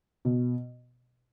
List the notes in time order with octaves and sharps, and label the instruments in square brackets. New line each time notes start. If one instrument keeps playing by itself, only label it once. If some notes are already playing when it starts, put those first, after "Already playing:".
[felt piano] B2